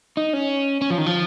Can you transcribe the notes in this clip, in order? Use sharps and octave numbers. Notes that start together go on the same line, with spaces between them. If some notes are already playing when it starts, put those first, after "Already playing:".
D#4
C#4
C#4
F3
D#3
F3